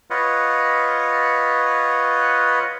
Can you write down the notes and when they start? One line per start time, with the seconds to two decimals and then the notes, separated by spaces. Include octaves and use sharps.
0.10 F4 B4 C#5 D#5 F#5